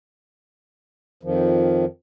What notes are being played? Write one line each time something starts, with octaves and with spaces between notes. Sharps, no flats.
F2 D#3 F3